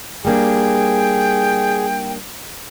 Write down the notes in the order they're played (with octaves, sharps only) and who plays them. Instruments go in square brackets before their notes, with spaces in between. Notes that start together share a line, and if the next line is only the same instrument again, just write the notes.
[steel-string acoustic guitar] G3 A#3 D4 [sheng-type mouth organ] G#4 [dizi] G5